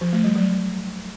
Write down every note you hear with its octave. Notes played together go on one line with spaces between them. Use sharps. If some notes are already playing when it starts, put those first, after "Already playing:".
F3
A3
G3
F#3